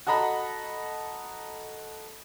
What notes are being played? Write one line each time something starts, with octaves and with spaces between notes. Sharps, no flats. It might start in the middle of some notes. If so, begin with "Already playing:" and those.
F#4 A4 D#5 A#5 B5